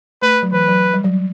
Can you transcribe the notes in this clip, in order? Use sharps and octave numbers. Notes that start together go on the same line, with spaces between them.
A3 B4
F#3
E3 B4
F#3
G3
F#3